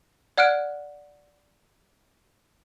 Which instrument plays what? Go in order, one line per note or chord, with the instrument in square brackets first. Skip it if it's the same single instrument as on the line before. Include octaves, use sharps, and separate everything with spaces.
[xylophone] D5 F#5 F6 F#6 D7